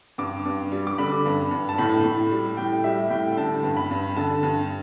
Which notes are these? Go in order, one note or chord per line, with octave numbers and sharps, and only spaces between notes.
G2 D6
G2
G3
D6
D3 B5
G2
G2
A5
A2 B5
A2
G3
A2 G5
G3 E5
A2 G5
G5
D3 A5
G2
B5
G2
D3 A5
G2